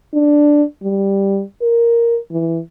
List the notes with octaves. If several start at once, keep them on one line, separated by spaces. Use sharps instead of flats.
D4
G3
A#4
E3